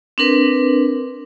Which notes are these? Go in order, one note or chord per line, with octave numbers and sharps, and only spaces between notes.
C4 D4 A#4 B4